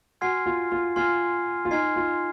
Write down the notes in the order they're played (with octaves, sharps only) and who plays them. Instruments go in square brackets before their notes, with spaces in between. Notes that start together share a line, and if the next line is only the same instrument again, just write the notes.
[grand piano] F#4 [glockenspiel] G#5 C6 F6 G#6 C7
[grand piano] F4
F4
[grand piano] F4 [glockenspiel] G#5 C6 F6 G#6 C7
[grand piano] F4
[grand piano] D#4 [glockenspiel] G#5 C6 F6 G#6 C7
[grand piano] F4